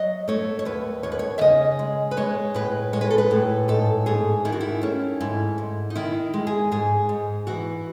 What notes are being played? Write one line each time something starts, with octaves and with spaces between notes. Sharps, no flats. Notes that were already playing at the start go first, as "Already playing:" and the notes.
Already playing: F#3 D#5
A3 C#5
C#5
D#2 B4
D#2 C#5
B4
C#5
E5
C#3 D#5
G#3
B4
G#3 C#5
A2 B4
G#3 C#5
B4
A4
B4
A2
G#2 A4
G#2 G#4
D#3 E4
F#4
E4
A3 C#4
G#2 E4
G#2
D#4
D#3 E4
G#3
G#4
G#2 G#4
G#2
E3 F#4